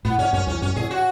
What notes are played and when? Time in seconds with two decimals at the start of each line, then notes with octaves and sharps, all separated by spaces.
0.05 A2 B3
0.18 G#2 C#4
0.33 F#2 C#4
0.47 E2 C#4
0.62 F#2 C#4
0.76 A2 G#4
0.91 F#4